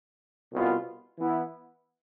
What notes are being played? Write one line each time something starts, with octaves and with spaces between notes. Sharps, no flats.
C2 B2 B3 F4
E3 B3 E4